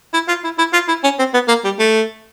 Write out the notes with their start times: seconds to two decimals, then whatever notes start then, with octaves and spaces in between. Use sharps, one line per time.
0.14 E4
0.28 F4
0.44 E4
0.59 E4
0.73 F4
0.88 E4
1.04 C#4
1.19 C4
1.34 B3
1.48 A#3
1.64 G3
1.79 A3